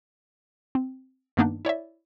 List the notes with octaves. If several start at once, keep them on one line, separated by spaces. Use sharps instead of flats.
C4
G2 D#3 A#3 B3 D4 D#4
E4 C#5 D5 E5